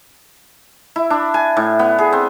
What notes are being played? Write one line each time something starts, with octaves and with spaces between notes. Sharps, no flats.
E4
D4
G#5
A2
B3
G#4
C4